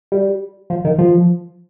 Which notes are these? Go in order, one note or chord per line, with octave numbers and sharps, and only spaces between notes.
G3
F3
D#3
F3